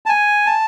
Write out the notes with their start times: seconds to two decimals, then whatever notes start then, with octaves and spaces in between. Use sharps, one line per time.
0.06 A5
0.09 G#5
0.46 A5